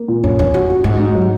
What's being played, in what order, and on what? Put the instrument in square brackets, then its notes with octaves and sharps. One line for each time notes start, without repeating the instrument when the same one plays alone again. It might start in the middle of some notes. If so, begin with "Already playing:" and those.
Already playing: [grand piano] A#3
A#2
[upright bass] F#2 [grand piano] C#4
[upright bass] E2 [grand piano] C#4
[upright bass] F#2 [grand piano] F#4
[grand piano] F#4
[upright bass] G#2 [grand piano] F#4
[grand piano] D#4
F#3